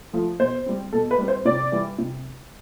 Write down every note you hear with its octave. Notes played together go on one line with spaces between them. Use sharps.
F3 A3
B2 C5
G3 C4
B2 A4
B4
G3 C4
C5
C3 D5
E3 G3
C3